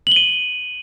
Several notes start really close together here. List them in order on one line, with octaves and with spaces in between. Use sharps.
F#7 G7 D#7